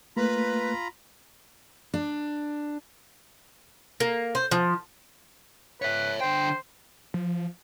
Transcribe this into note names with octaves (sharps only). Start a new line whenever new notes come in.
A3 A#3 F4 B4 A#5 B5
D4
A#3
C5
F3
B4 C#5 E5
D3 C5 G5
F3